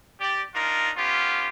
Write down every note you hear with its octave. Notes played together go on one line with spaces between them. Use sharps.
G4 D5
D4 D#4 F4 A#4
B3 C#4 F4 G4